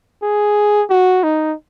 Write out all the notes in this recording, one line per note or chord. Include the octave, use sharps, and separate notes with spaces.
G#4
F#4
D#4